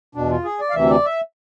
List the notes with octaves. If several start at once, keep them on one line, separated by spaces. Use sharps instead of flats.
E2 B2 D4
F4
G#4
D5
F5
D2 C3 E3 E5
D5
E5